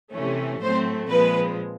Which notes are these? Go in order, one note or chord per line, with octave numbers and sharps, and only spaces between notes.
C3 E3 A3 C#4
A2 F#3 A3 C4 C5
A#2 F3 G#3 C4 B4